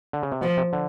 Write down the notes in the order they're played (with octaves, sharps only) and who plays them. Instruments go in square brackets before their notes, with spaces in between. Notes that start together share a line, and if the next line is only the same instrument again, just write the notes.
[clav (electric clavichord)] D3
C#3
C3
[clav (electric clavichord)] B2 [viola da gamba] F3
[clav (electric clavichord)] C3
D3